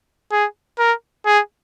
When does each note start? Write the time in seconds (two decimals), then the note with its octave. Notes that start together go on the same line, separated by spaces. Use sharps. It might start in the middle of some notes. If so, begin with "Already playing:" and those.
0.32 G#4
0.79 A#4
1.26 G#4